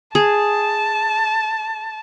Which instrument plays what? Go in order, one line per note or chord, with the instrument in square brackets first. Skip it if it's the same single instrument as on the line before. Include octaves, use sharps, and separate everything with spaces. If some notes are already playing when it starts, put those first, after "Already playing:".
[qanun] G#4 [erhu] A5